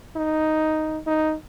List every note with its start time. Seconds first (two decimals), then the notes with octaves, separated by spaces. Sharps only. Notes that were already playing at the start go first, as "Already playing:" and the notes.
0.16 D#4
1.07 D#4